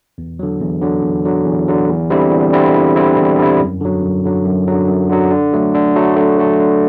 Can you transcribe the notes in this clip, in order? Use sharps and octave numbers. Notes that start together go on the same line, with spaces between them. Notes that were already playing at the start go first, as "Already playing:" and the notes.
E2
D3 F#3
E2
D3 F#3
E2
D3 F#3
E2
D3 F#3
E2
D3 G3 C4 E4
E2
D3 G3 C4 E4
E2
D3 G3 C4 E4
E2
D3 G3 C4 E4
F#2
D3 F#3
F#2
D3 F#3
F#2
D3 F#3
F#2
D3 F#3
D3
F#3 A3
D3
F#3 A3
D3
F#3 A3
D3